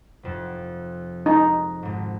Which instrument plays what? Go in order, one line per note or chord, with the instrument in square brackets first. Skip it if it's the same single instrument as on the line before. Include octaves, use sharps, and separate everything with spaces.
[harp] F1 F2
[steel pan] D#4
[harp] G#1 G#2